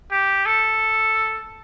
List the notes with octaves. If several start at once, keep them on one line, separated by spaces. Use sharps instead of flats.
G4
A4